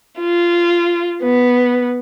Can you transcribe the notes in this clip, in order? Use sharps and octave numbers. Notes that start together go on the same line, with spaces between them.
F4
B3